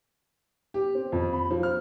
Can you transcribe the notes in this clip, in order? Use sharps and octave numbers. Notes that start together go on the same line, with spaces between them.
G4
C4
F2
B5
F3
F6